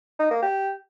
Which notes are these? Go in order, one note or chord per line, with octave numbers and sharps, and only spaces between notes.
D#4
A#3
G4